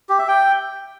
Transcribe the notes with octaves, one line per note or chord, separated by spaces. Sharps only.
G4
E5
G5